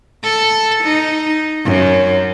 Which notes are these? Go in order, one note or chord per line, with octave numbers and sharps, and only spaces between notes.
A4
D#4
F#2